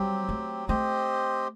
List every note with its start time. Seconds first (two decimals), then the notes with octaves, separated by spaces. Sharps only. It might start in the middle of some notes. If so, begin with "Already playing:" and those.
Already playing: F#3 G3 C4 G4
0.29 A3
0.68 A3 C4 G4 C5 D#5